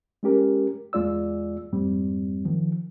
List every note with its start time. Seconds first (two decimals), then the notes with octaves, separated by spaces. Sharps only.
0.23 G#3 C#4 G4 A#4
0.93 E2 G#3 F4 D5 E6
1.73 F2 G#2 G3 C4
2.45 D#3 F3